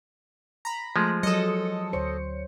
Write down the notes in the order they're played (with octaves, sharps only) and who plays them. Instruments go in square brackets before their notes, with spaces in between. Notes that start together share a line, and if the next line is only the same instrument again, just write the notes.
[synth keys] A#5 B5
[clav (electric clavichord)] F3 G#3 [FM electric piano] A3
[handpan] F#3 [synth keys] A4 D#5 [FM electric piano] D#6 C#7
[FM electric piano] D2 C#5 C#7 [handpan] C5